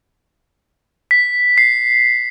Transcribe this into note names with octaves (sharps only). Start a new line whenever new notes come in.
B6
C7